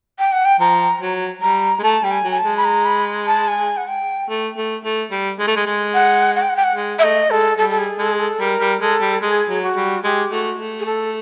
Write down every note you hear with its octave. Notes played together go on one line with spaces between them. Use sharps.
G5
F#5
G5
F3 A#5
F#3
G3 A#5
G#3
A3 A5
G3 G5
G#5
F#3
G#5
A5
G#3
B5
A#5
B5
A5
G#5
F#5
G5
A3
A3
A3
G3
G#3
A3
G#3
G#3
F#5
F#5
G5
F#5
G5
F#5
G#3
E5
A3 D#5
G#3 A4
G3 A4
A4
G#4
G#3 A4
G#4
A4
G3 A#4
G3
G#3 A4
G3
G#3 G#4
F#3
F#4
G3
G#3 G4
A3 F#4
A3
G#4
A4